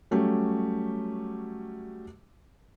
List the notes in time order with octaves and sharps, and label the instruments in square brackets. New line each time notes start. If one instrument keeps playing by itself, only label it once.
[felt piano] F#3 G3 A3 C#4 G4